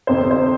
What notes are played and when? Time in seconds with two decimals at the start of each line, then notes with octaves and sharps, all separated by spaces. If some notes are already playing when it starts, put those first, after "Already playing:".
0.07 G1 F2 C3 C5
0.31 C5